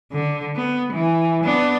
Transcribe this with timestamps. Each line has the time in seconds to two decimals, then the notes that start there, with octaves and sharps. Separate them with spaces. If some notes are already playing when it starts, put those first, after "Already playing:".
0.13 D3
0.56 B3
0.93 E3
1.44 B3 D4